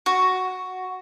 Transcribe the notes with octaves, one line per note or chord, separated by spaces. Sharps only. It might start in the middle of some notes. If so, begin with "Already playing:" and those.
F#4